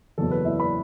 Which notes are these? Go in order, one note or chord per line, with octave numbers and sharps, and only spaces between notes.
F#1 E2 B2 F#3 A4
B4
E4 E5
B4 B5